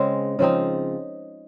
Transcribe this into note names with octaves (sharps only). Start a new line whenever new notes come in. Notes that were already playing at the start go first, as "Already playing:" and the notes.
Already playing: C#3 G#3 C4
C#3 F3 C4 D#4